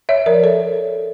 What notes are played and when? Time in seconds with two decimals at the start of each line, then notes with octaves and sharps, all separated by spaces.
0.09 C#5 E5
0.26 F3 A#4 D5
0.43 A4 C#5